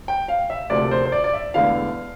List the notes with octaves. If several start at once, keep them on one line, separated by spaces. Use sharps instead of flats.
G5
F5
E5
D2 C3 F3 A#3 D5
C5
C5
D5
D5
E5
E1 E2 D3 A3 E4 F5